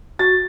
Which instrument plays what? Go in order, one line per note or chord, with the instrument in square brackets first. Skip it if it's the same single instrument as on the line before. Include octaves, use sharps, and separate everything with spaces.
[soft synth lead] F#4 [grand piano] A6